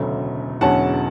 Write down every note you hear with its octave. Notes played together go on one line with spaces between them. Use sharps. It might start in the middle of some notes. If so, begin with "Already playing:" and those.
Already playing: E1 D2 C#3 F#3 A3
E1 E2 D3 F#3 C#4 F#5 A5